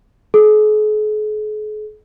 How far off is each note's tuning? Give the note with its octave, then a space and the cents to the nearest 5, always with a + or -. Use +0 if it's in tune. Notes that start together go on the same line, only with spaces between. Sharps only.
G#4 +45